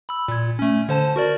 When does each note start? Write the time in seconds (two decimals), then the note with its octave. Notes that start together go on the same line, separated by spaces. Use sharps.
0.09 B5 E6
0.28 A#2 G#6
0.59 A3 C#4
0.89 D3 C5 A5
1.16 F#4 A#4 D5